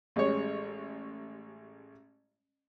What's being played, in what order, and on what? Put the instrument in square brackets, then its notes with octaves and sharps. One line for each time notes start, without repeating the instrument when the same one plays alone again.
[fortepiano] A1 G3 G#3 C#5